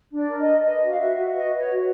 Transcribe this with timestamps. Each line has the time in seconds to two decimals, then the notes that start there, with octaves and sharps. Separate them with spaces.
0.11 D4
0.17 D5
0.28 A#4
0.39 D#5
0.46 A#4
0.64 B4 D#5
0.81 F#4
0.89 F5
0.98 F#4 E5
1.16 F#4
1.33 B4 D#5
1.51 B4
1.57 C#5
1.69 F#4